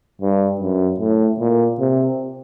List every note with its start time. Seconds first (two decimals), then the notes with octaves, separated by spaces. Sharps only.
0.22 G2
0.61 F#2
1.00 A2
1.40 A#2
1.80 C3